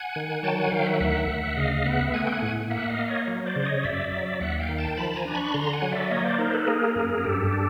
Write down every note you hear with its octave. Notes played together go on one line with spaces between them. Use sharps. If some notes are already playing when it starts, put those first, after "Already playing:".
Already playing: F#5 G#5
D#3
F#3 G5 A5
F#5 G#5
D#3 F5 G5
E5 F#5
D2 E5 F#5
D2
C#3 D#5 F5
B3 E5 F#5
A3 F#5 G#5
G5
F#5 G#5
A2
A#3 E5 F#5
D#5 F5
A#3
C#5 D#5
F#3
C5 D5
C#3
C#5 D#5
F#2 D5 E5
F#3
D#2 E5 F#5
F5 G5
D#3
G5 A5
F3 A5 B5
G#5 A#5
D4
B5 C#6
D3 A#5 C6
F#5 G#5
F#3
D5 E5
A#3 C#5 D#5
C5 D5
D#4 A#4 C5
A4 B4
A#3 G#4 A#4
F#2
G2 G4 A4
D4